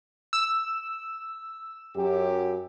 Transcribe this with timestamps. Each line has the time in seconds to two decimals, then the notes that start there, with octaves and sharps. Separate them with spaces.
0.33 E6
1.96 F#2 G4